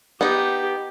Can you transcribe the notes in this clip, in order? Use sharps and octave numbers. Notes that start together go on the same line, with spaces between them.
B3 D#4 G4